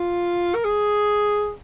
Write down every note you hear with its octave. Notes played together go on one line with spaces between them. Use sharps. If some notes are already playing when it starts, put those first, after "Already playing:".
Already playing: F4
A#4
G#4